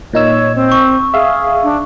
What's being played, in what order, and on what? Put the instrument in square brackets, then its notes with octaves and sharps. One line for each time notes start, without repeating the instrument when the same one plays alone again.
[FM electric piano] A#2 D#4 E6 [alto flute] C#5
[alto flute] C4
[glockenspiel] C#6
[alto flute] G#4 [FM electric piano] E5 F5
[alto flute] D4